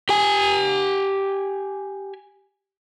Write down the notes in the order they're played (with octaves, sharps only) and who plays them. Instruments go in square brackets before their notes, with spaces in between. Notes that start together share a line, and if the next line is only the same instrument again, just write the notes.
[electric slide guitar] G4 G#5